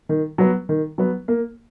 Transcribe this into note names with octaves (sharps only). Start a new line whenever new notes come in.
D#3
F#3 B3
D#3
F#3 B3
A#3